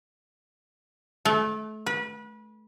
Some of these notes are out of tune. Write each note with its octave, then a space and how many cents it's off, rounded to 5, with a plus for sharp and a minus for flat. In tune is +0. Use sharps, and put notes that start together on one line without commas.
A3 -30
B4 -30